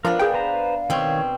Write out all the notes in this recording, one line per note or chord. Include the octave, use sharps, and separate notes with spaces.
F3 B3 D4 A#4 F5
G#4 G5
B4 C5 A#5
B2 D#3 C4 C#5